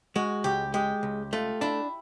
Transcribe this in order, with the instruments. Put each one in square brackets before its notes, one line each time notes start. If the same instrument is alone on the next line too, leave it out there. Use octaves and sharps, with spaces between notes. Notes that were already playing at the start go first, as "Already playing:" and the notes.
[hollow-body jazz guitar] G#3 [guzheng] F#4
[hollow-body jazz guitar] C#2 [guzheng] G4
[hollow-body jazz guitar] G#3 [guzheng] G4
[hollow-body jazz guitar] C#2
[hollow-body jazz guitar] A3 [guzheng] F4
[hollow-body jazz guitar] D4 [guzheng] E4